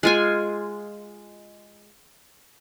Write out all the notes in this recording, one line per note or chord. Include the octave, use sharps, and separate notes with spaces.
G#3 F4 G#5